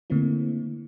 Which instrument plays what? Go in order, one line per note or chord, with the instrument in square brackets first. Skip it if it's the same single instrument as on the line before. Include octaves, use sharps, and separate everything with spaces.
[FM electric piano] D3 A3 A#3 C4 E4